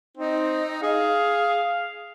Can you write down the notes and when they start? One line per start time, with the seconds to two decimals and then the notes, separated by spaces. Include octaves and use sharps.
0.17 C4 D#4
0.83 G#4 F5